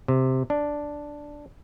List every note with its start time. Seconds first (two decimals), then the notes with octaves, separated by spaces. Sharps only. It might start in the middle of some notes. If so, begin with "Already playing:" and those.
0.08 C3
0.50 D4